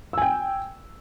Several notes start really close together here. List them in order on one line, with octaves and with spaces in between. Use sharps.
E6 G#5 G5